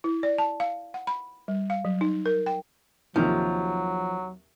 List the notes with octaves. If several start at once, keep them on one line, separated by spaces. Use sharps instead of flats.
E4
D5
A5
F5
F#5
B5
G3
F5
F#3
D#4
A#4
G5
D#2 C3 D#3 F3 F#3